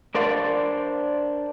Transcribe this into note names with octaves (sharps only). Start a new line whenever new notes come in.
D4 A#4 C5 D5 F5